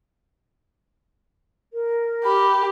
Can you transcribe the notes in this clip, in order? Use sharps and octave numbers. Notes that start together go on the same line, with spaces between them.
A#4
G4 B5